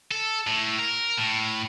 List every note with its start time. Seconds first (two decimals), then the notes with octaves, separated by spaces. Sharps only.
0.11 A4
0.47 A2
0.79 A#4
1.17 A2